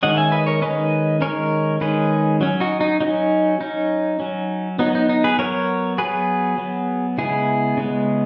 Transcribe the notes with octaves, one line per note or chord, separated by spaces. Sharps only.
D#3 G#3 C#4 D#5 F#5
E5 G#5
B4 D#5
A#4 C#5
D#3 G#3 C#4 B4 D#5
D#3 G#3 C#4 A#4 C#5
D#3 G#3 C#4 G#4 B4
F#3 C#4
D#4 F#4
D#4
F#3 C#4 D#4
F#3 C#4 D#4
F#3 C#4
F#3 B3 D#4
D#4
D#4
G#4 B4
F#3 B3 A#4 C#5
F#3 B3 G#4 B4
F#3 B3
C#3 G#3 B3 E4 G#4
C#3 G#3 B3